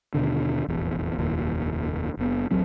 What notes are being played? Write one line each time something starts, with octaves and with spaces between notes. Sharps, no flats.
D#2 B2 D3
F1 A#1 E2
F1 D#2 A#2
F#1 B3
D1 A1 F#3 C4